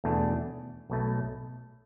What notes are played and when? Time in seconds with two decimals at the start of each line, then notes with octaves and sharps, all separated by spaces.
0.04 E2 B2 A3 D4
0.90 B1 B2 A3